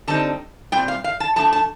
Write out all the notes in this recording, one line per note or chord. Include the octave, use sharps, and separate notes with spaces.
D3 G3 C4 D#4 A5
A#2 G3 C4 G5
F5
F5
A5
F3 A3 D4 A5
A5